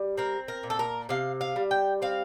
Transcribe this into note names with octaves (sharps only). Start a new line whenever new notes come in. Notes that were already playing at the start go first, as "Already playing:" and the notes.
Already playing: G3
C4 A#4
A#4
A#2
A4
A#4
C3 F5
F5
G3
G5
C4 F5